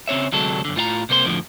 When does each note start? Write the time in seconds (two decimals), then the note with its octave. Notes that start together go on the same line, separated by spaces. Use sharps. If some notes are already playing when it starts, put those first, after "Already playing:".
0.08 C#3 C4 C#5 E5
0.32 D2 C3 F#3 G#3 A4
0.65 F#2 D3
0.76 A2 F4 F5 A#5
1.09 C2 C3 A#3 C5 C6
1.24 F2 A2 D3 F3